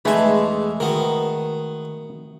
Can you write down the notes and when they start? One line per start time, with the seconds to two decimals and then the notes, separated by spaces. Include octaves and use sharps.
0.05 E2 G#3 A3 B4 E5 G#5
0.80 D#3 B3 F#4 A#4